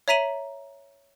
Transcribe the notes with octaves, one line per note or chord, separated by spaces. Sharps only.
C#5 E5 A#5 B6 D#7 F#7